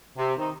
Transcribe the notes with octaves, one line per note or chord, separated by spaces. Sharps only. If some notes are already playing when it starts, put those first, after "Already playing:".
C3
D#3 C4 D#4